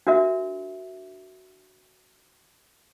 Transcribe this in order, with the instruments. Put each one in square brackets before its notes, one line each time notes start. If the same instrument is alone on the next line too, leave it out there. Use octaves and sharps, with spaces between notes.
[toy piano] D4 F#4 A#4 E5